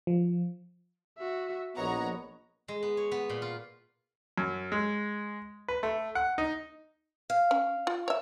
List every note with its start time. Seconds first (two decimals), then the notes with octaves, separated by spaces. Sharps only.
0.07 F3
1.18 F#4 E5
1.77 A#1 B3 C#5 D#5 F#5 A#5
2.68 G#3
2.83 B3
2.97 C#5
3.11 B3
3.29 A#2
3.42 F4
4.38 F#2
4.72 G#3
5.68 B4
5.83 A3
6.15 F#5
6.38 D#4
7.30 F5
7.51 C#4
7.87 F4
8.08 C#5 E5